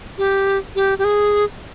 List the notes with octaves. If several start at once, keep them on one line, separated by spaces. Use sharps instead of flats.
G4
G4
G4
G#4